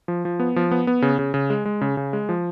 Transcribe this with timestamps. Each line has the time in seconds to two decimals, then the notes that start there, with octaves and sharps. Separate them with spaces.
0.08 F3
0.25 F3
0.40 B3
0.56 F3
0.71 B3
0.87 B3
1.02 C#3
1.19 C#3
1.34 C#3
1.50 G#3
1.65 G#3
1.81 C#3
1.97 C#3
2.13 G#3
2.29 F3